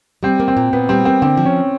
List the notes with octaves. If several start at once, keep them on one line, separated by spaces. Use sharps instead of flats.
G3 C4
A#3
C4
A#2
A#2 B3
G3 C4
A#3 C4
D3 C4
F3
C#4